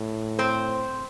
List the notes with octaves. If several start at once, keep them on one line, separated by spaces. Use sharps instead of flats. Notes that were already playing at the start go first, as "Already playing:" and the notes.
Already playing: A2
C4 C5